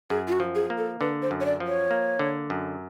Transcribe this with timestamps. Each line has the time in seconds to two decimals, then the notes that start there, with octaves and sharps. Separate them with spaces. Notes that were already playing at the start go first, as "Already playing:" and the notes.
0.10 F#2 G#4
0.28 F4
0.32 F#4
0.40 F3
0.55 G#4
0.70 A#3
0.78 A4
1.01 D3 B4
1.22 C5
1.31 F#2
1.41 C#5
1.45 D5
1.60 F3
1.67 C#5
1.91 A#3
2.19 D3
2.50 F#2